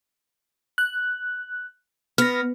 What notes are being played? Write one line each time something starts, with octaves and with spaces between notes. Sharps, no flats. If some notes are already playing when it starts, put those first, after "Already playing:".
F#6
B3 F6 A#6